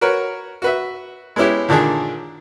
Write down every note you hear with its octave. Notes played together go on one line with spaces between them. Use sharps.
F#4 A#4 B4 C#5
F#4 B4 E5
G#3 B3 C#4 E4 G4
A#2 D3 D#3 D4 G#4